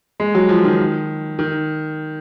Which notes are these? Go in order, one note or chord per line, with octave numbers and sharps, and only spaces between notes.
G#3
F#3
F3
D#3
D#3